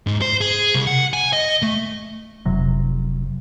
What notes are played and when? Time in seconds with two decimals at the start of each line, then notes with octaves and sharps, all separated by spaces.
0.07 G#2
0.22 C5
0.41 G#4
0.75 C2
0.87 F#5
1.13 G#5
1.33 D#5
1.62 A3
2.46 F1 C3 F#3